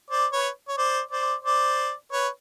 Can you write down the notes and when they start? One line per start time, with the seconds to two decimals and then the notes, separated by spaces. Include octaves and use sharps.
0.10 C5 D5
0.33 B4 C#5
0.68 C#5
0.77 C5 D5
1.11 C5 D5
1.44 C5 D5
2.12 B4 C#5